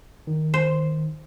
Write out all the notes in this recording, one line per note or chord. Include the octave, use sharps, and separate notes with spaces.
D#3
C5